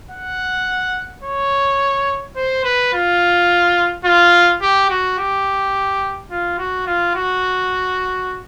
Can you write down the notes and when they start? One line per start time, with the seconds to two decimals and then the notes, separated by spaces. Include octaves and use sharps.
0.11 F#5
1.24 C#5
2.36 C5
2.64 B4
2.93 F4
4.05 F4
4.62 G4
4.90 F#4
5.18 G4
6.31 F4
6.58 F#4
6.87 F4
7.15 F#4